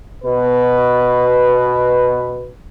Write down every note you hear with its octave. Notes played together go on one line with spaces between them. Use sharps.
B2 B4